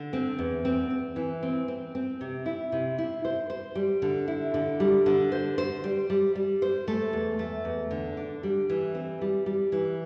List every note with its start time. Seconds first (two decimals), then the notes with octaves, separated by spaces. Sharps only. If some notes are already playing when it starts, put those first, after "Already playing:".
Already playing: D3
0.13 C4
0.39 E2
0.65 C4
0.90 C4
1.16 E3
1.43 C4
1.68 C4
1.95 C4
2.21 C3
2.46 E4
2.72 C3
2.98 E4
3.25 C5
3.50 C5
3.75 G3
4.02 D3
4.28 E4
4.54 D3
4.80 G3
5.06 D3
5.32 C5
5.58 C5
5.84 G3
6.10 G3
6.35 G3
6.62 C5
6.88 A3
7.13 E2
7.39 A3
7.65 E2
7.91 D3
8.17 D4
8.43 G3
8.70 E3
8.95 C4
9.21 G3
9.46 G3
9.72 E3